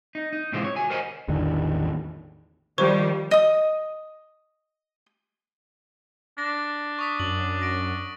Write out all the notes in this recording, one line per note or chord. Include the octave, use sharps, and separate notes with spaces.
D#4
D#4
A2 C3 E3 G#3 C4 F4
C#5
F#4 G#5
A#4 C5 D#5 F#5 G#5
A1 E2 D3 D#3
D#3 F3 G3 C5 C#6
D#5 D#6
D4 A#6
C#6 D#6 B6
F#2 F#7
A#6 D7